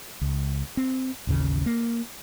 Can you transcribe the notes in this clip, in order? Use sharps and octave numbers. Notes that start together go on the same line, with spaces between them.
C#2
C4
A1 D#2 C#3
A#3